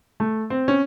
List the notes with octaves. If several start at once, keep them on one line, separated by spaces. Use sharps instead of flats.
A3
C4
C#4